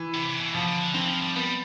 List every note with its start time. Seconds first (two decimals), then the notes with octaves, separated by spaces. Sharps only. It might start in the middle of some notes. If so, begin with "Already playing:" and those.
Already playing: E3
0.14 C3
0.29 C3
0.40 B2
0.53 B2 F3
0.68 D3
0.81 D3
0.94 E3 C4
1.09 F3
1.22 G3
1.36 G3 B3